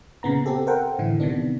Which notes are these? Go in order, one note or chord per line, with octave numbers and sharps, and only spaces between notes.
A#2 C#3 B3 A#5
C4 G4 A4
A4 A#4 C5 F#5 G5
A2 D3 E3 E4
C3 D#3 B3 D4